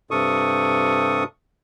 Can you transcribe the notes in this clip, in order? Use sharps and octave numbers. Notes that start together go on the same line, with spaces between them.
G2 C3 A4 C#6 D#6